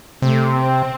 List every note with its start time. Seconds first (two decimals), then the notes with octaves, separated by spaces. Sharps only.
0.22 C3 A3
0.55 C4